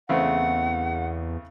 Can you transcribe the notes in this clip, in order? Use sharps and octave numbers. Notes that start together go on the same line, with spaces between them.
E2 C#3 A3 C4 F#5